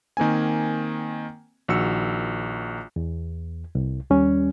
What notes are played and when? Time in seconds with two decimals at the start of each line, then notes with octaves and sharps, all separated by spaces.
0.17 D#3 A#3 C4 G#5
1.68 A#1 D#3 F#4 A#4 E6 C#7
2.96 E2
3.75 C2
4.10 D#2 G3 C#4